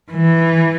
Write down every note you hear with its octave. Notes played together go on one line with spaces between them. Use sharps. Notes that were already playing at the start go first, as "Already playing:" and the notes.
E3